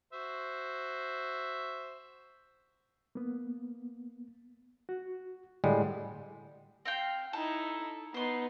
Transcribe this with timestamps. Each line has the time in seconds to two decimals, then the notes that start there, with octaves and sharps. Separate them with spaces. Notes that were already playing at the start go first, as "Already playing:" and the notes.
0.13 F#4 C5 E5
3.15 A#3 B3
4.89 F#4
5.64 A2 D3 G3 G#3 F#5
6.85 C4 F5 G5
7.33 D#4 E4 A4
8.14 B3 D#4 C5 C6